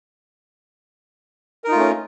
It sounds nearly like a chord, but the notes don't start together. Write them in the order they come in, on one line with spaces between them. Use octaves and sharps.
A#4 D#4 F4 A3 C#4